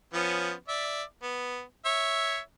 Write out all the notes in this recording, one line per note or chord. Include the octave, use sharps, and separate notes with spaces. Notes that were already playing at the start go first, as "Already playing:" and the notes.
F3 B3 C#4
D5 E5
B3
C#5 E5